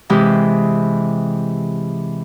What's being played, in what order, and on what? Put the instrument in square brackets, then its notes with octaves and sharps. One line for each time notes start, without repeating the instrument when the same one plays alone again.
[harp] C3 E3 G#3 G4